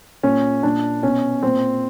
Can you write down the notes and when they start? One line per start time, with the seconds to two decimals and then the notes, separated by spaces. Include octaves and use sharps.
0.23 A#2 C#4
0.63 A#2 D4
1.03 B2 C#4
1.43 A#2 C4